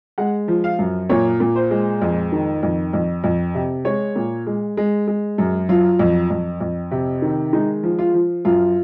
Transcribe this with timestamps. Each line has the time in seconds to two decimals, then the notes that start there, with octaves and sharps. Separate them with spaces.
0.18 G#3 F#5
0.48 F3
0.64 F5
0.79 F#2
1.09 A#2 C#5
1.40 A#2
1.55 C5
1.71 G#3
2.02 F2
2.32 D#3
2.63 F2
2.93 F2
3.24 F2
3.55 C3
3.85 G#3 C#5
4.16 A#2
4.47 G#3
4.77 G#3
5.07 G#3
5.38 F#2
5.69 F#3 F4
5.99 F2
6.30 F2
6.61 F2
6.91 C3
7.22 D#3
7.53 G#3 D#4
7.83 F3
7.99 F4
8.14 F3
8.45 F#2 F4